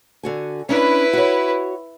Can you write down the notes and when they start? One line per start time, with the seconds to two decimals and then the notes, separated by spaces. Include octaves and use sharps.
0.23 D3 F#4 G#5
0.69 C#4 D4 E4 B4 E5
1.13 F#4 C#5